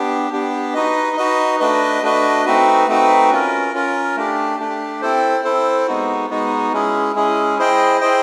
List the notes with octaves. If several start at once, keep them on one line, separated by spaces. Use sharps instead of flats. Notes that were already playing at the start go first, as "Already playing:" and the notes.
Already playing: B3 D4 G4
B3 D4 G4
D#4 F#4 B4 D#5
D#4 F#4 B4 D#5
A3 D4 F#4 B4 D#5
A3 D4 F#4 B4 D#5
A3 C4 D#4 F#4 B4
A3 C4 D#4 F#4 B4
C#4 F4 A#4
C#4 F4 A#4
A3 D4 G4
A3 D4 G4
C4 E4 A4 C5
C4 E4 A4 C5
G#3 B3 D#4 F#4
G#3 B3 D#4 F#4
G#3 C#4 E4 G#4
G#3 C#4 E4 G#4
E4 G#4 C5 D#5 G5
E4 G#4 C5 D#5 G5